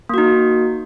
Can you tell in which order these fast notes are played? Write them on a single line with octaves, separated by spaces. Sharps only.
A#3 F#4 D#4